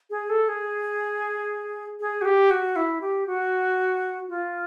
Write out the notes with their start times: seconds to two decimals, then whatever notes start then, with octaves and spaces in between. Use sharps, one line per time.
0.10 G#4
0.30 A4
0.48 G#4
2.00 G#4
2.22 F#4
2.25 G4
2.50 F#4
2.76 E4
3.01 G4
3.27 F#4
4.29 F4